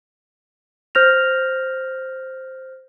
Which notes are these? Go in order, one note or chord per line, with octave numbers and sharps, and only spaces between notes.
C5 F6 G6 A#6 F7